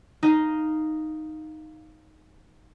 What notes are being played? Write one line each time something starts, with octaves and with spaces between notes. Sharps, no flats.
D#4 D#5 F5